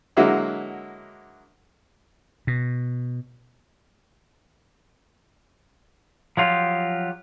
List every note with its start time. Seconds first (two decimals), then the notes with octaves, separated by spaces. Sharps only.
0.17 D3 F#3 G#3 A#3 E4 F#4
2.47 B2
6.37 F3 F#3 F4 G4